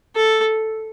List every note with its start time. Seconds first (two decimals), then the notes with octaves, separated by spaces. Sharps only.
0.16 A4